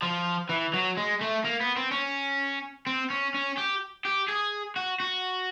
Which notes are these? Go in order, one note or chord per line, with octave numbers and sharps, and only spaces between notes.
F3
E3
F#3
G#3
A3
A#3
B3
C4
C#4
C4
C#4
C#4
G4
G4
G#4
F#4
F#4